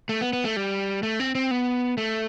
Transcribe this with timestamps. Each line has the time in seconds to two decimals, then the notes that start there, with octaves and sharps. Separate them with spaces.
0.09 A3
0.21 B3
0.33 B3
0.45 A3
0.56 G3
1.03 A3
1.20 C4
1.35 C4
1.51 B3
1.98 A3